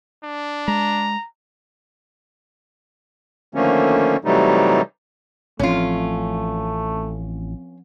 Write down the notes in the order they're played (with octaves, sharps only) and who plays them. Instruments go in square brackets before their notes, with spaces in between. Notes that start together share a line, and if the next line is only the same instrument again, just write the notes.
[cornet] D4
[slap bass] G#3 [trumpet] A#5
[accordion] D3 D#3 F3 A3 A#3 C#4
C3 E3 F#3 G3 A3 D#4
[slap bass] A1 [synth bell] F3 C4 [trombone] A3 [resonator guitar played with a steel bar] C#4 F4